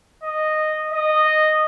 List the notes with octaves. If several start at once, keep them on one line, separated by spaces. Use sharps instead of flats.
D#5
D#5